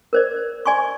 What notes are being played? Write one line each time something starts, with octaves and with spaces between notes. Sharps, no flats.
A#4 C5 D5
D5 G#5 C6 C#6